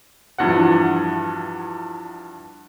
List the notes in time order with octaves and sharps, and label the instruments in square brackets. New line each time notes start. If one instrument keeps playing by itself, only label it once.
[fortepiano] E2 G2 F#5 [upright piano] F3 E4 F#4